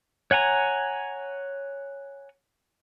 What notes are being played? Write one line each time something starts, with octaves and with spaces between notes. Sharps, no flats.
C#5 F#5 G#5 A#5